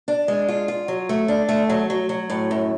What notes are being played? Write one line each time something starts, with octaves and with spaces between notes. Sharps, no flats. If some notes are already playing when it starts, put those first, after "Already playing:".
D4
G#3
F4
F4
F#3
A3
D4
A3
F#3
F#3
F#3
A2
F#2